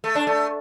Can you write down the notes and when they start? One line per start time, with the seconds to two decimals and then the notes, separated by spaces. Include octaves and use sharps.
0.04 A3
0.15 D4
0.27 A3